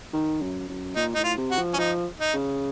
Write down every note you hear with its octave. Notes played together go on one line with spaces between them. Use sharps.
D#3
F#2
F#2
A#2 D#4
A2 D#4
F4
C3
F#4
F3
C#4
F3 D#4
D#4
C#3